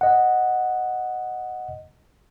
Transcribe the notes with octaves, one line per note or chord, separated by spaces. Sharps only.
D#5 F#5